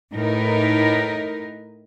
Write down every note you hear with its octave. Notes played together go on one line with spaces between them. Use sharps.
A2 D#4 A#4 B4